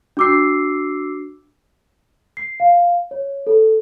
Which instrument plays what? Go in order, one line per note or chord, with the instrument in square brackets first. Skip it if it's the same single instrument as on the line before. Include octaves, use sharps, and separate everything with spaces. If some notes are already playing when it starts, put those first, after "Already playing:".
[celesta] D4 F#4 D6 E6 C7
C7
F5
C#5
A4